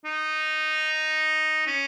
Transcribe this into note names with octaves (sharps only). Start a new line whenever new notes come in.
D#4
C#4